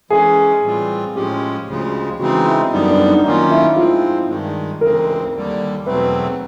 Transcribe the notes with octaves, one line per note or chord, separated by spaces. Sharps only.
E3 G#3 C#4 G#4
A2 E3 G3 C4 F4
A2 F3 G#3 C#4 G4
D2 C#3 F3 G#3
C#3 E3 G#3 C4 D#4 F#4
E4
F#2 D3 G3 B3 D#4
D4
D#4
D#3 F#3 A#3 C#4 D#4 F4
E4
F3 G#3 C4 F4
G2 D#3 G#3
D2 C#3 E3 G#3 C4 A#4
D#2 D3 G3
E2 B2 F#3 A3 C4 B4